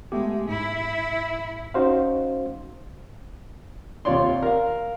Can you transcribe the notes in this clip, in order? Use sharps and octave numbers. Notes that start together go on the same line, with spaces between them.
G#3 A3 B3 G4
G#2 E4
C#4 D#4 F#4 C5 F5
D#2 C3 F4 C#5 D5 C6
A#4 F5